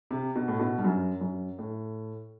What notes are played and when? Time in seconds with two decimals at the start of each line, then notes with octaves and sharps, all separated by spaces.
0.11 C3
0.35 B2
0.48 A2
0.59 B2
0.78 G2
0.84 F#2
1.21 F#2
1.59 A2